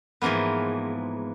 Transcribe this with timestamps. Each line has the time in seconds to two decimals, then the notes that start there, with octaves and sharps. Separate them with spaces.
0.22 G#2 E3 F3 A#3 B3